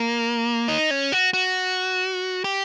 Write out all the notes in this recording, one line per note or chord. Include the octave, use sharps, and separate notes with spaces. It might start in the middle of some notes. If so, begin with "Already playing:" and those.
Already playing: A#3
D#4
C#4
F#4
F#4
G4